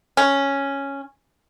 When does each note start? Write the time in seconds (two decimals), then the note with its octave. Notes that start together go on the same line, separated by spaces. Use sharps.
0.17 C#4